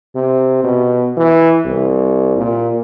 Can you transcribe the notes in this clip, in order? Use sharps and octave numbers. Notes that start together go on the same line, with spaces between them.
C3
B2
E3
C2
A#2